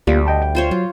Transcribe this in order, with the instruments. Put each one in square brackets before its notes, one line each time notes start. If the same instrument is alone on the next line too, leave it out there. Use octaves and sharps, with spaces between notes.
[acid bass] D2 [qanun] G3 [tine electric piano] A#3 F4 G4
[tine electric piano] D#5 G5 A5
G5
[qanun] F4 C5 C#5
[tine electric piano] F#3 [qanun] F4